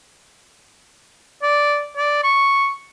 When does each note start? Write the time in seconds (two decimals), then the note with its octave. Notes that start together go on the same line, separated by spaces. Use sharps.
1.42 D5
1.97 D5
2.24 C#6